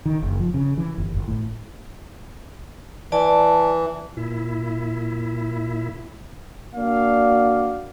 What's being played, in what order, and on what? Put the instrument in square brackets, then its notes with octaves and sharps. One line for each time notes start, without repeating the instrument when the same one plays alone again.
[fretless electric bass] D#3
F#1
F3
C#3
E3
G1
G1
A2
[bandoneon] E3 [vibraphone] D5 A5
[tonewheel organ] A#2 E4
[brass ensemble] A#3 D4 F#4 D5 F5